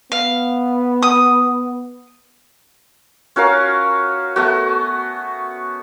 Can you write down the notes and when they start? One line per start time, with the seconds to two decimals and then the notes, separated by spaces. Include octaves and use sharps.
0.12 B3 F5
1.02 D#6
3.36 C#4 F#4 A#4 F5
4.36 A3 B3 F#4